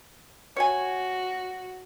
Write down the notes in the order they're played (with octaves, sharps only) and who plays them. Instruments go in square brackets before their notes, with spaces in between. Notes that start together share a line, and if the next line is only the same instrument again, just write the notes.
[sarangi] F#4 [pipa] C#5 G#5